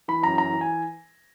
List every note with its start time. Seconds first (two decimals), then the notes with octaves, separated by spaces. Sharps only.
0.08 E3 B5
0.23 F#2 A#5
0.38 E3 A#5
0.53 E3
0.61 G#5